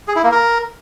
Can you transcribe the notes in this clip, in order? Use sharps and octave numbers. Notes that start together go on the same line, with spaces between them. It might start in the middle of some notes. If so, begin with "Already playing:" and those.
G#4
E4
A#3
A#4